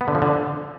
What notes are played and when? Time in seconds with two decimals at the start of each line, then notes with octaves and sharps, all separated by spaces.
0.01 B3
0.08 D3
0.15 F3
0.22 D3